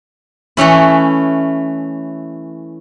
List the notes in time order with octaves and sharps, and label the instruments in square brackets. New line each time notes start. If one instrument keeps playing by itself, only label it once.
[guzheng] E3 A3 C#4 E4